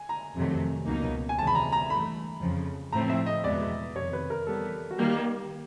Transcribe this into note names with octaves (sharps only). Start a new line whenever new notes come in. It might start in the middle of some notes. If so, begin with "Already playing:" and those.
Already playing: G#5
A#5
F2 C3 D#3 F#3 A3
C#2 B2 F#3 A#3 D#4
G#5
E2 C3 D#3 G#3 C#4 A5
B5
A#5
A#5
G2 E3 A3 B5
F2 C#3 F3
A2 F3 A3 C4 A#5
E5
D#5
E2 B2 G#3 B3 D5
F2 C3 D#3 C#5
B4
A#4
E3 G3 B3 A4
F#4
D#3 G3 A#3 G4